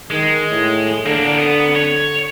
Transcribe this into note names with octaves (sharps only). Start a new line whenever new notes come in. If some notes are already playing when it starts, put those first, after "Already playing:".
D#3 G#3
A2
D3 A#3 D4
B3
C#5